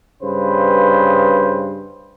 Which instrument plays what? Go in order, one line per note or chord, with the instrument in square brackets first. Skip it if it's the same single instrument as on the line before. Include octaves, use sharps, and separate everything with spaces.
[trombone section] G2 C#3 B4 C5